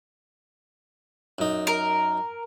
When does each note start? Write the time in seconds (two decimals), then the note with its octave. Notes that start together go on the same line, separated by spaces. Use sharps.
1.38 F#2 D#4
1.67 A#4